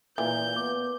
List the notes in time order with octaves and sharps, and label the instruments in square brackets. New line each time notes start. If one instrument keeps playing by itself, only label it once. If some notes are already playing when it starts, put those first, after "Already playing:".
[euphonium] A#2 [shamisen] E3 [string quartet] G6
[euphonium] B3 [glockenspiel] D6